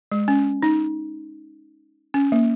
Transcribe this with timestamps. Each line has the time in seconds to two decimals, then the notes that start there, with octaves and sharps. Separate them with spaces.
0.12 G#3
0.28 C#4
0.62 D#4
2.14 C#4
2.32 A#3